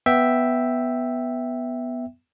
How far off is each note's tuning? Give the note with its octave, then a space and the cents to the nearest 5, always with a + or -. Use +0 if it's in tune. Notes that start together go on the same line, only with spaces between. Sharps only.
B3 +0 E5 +0 G5 +0